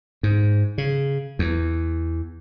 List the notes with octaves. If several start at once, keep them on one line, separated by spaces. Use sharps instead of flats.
G#2
C#3
E2